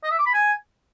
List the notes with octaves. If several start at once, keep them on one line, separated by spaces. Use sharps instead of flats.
D#5
E5
D6
B5
G#5